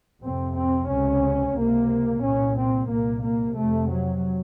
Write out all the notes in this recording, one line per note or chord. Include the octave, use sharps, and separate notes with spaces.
F2 C3 C4
C4
C#2 C3 C#4
C#2 C3 A#3
C2 A#2 C#4
C4
C2 A#2 A#3
A#3
F2 C3 A3
F#3